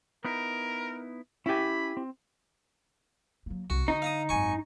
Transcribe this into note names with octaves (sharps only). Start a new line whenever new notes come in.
B3 D#4 E4 A#4
C#4 E4 G4 E5 G#5 B5
C4
F#3 A#3
C2 F#4
D3 D#4
F5 A#5 D#6
G#1 F#2 G#5 C#6